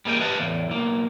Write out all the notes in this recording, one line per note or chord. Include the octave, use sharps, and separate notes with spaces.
G3 A#3 G#4 D#5 G5
G4 B4 D#5 F5 A5
E2 A2
B1 A#3